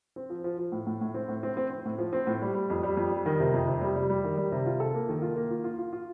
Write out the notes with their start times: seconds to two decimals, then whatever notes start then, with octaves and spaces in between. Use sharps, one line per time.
0.16 C4
0.30 F3
0.44 F3
0.59 F3
0.72 A2
0.87 A2
1.01 A2
1.14 C4
1.29 A2
1.43 C4
1.57 C4
1.70 C4
1.86 A2
1.98 F3
2.13 C4
2.27 A2
2.42 G3
2.55 G3
2.70 F2
2.83 G3
2.97 F2
3.11 G3
3.26 D#3
3.40 C3
3.54 F2
3.67 C3
3.81 G3
3.96 G3
4.10 G3
4.24 D#3
4.38 G3
4.52 C3
4.66 F4
4.80 A4
4.94 A#3
5.09 D#3
5.22 F4
5.36 A#3
5.50 F4
5.64 F4
5.78 F4
5.93 F4